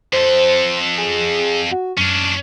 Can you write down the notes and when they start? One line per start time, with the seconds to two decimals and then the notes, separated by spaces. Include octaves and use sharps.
0.13 F2 A4 C5
0.98 G#4
1.71 F#4
1.98 F#2 C#4 D4